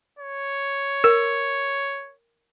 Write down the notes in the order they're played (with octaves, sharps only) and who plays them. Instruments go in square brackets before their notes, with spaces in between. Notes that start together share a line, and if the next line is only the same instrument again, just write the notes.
[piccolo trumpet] C#5
[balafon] A#4